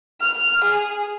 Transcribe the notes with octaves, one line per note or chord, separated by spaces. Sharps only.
F6
G#4